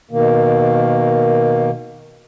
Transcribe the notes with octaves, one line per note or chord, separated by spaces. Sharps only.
B2 D#3 A#3